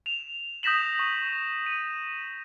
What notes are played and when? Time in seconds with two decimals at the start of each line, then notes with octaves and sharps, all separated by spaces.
0.06 E7 F7
0.63 D#6 G6 A#6 B6 E7 F#7
0.99 C#6
1.66 D#7